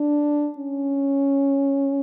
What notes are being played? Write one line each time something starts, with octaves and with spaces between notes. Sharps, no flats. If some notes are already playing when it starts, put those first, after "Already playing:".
Already playing: D4
C#4